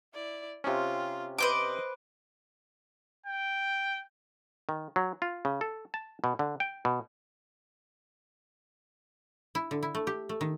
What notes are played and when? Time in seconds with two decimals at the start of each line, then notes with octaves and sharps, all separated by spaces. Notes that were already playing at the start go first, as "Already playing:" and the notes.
0.14 E4 D5
0.64 C3 C#4 F4
1.38 B4 C5 D#5 D6
3.26 G5
4.69 D#3
4.96 F#3
5.22 F4
5.45 C#3
5.61 A4
5.94 A5
6.24 B2
6.39 D3
6.60 G5
6.85 B2
9.55 E4
9.71 D3
9.83 E4
9.95 A3
10.07 G4
10.29 A3
10.41 D#3